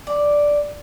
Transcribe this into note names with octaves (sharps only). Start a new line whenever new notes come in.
D5